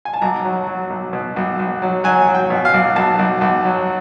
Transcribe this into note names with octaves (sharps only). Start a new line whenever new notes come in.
G#5
A5
B1 A#5
F#3
F#3
B1
B2
B1
B1
F#3
F#3 G#5
F#3
G5
B2
F5
B1
B1 A5
B1
B1
F#3